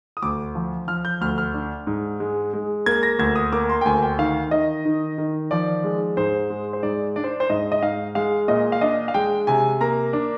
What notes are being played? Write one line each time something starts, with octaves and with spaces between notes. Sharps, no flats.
D#6
D2 D6
F3
F3 F6
G6
D2 F6
F6
D4
G#2
G#3
G#3
A#3 G#6
A#6
D2 G#6
D#6
A#3 D6
C6
G5
D2 G#5
G5
D#3 F5
D#3 D#5
D#3
D#3
F3 D5
G#3
G#2 C5
G#3
C5
G#2 D5
D4 D5
C5
C5
G#2 D#5
D#5
G#2 F5
G#3 F5
A#2 D#5
F5
D4 D#5
F5
G#3 G5
C3 G#5
A#3 A#5
D4